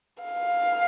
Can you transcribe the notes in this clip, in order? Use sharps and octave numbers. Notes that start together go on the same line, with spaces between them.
F5